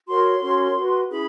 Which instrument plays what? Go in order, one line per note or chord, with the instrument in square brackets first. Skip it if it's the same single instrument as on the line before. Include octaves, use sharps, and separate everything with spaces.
[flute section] F#4 A#4 C#5 C6
C#4 F#4 A#4 C#5
F#4 B4
C#4 E4 G#4 B5